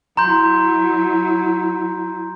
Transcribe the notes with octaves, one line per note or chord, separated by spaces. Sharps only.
F#3 E4 A#5 C6 G6